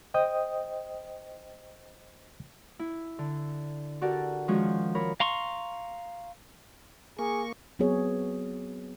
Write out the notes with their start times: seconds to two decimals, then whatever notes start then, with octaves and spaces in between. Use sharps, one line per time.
0.14 C5 D#5 G5 D#6
2.79 E4
3.19 D3
4.01 F#4 G4 A4 A#4 D5 F#5
4.48 D#3 F3 G#3 C#4 F#4 C#5
4.95 A#4 C#5 B5
5.20 F5 A#5 C6 C#6
7.19 A#3 G#4 C#6
7.79 F#3 B3 C4 F#4 G#4 C#5